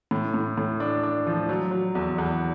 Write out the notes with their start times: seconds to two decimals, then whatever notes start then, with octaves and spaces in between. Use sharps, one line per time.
0.11 A2
0.34 A2
0.58 A2
0.80 D4
1.03 D4
1.27 F3
1.49 F#3
1.71 F#3
1.95 E2
2.18 E2